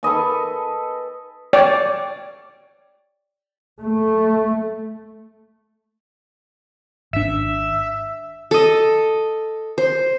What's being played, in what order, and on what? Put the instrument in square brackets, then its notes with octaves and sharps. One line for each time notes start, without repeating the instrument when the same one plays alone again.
[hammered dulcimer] A4 B4 D#5 G#5
[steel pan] C#5 D5 G5
[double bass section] A3
[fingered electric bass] G#1 D4 [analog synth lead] E5
[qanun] A4 D#5
C5